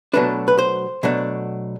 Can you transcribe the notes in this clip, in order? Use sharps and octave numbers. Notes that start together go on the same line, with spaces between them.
B2 F#3 A3 D4 B4
B4
C5
B2 F#3 A3 D4